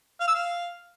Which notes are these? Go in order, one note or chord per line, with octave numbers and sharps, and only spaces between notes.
F5
E6
F5